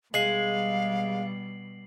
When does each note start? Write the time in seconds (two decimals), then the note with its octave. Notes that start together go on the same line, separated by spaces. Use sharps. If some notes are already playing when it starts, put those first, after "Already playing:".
0.14 B2 G3 G#3 F5 C7 F#7